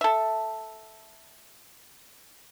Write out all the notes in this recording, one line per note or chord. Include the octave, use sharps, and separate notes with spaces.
A4 E5